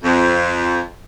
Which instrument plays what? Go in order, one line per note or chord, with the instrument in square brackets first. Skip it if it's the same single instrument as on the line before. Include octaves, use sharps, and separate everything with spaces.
[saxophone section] F2